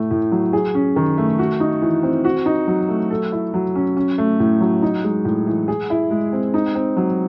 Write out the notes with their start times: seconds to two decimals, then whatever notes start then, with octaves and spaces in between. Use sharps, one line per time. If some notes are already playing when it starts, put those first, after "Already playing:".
Already playing: A2 A3
0.11 A2
0.32 F#3
0.53 G#4
0.75 C#4
0.96 D#3
1.18 A3
1.39 F#4
1.60 D#4
1.82 E3
2.03 C4
2.25 F#4
2.46 D#4
2.68 F#3
2.89 A3
3.10 A4
3.32 E4
3.54 F#3
3.75 C#4
3.97 C#4
4.18 A3
4.40 A2
4.61 F#3
4.82 D#4
5.04 G#3
5.25 A2
5.47 E3
5.68 G#4
5.90 E4
6.11 G#3
6.33 C4
6.54 D#4
6.75 C4
6.97 F#3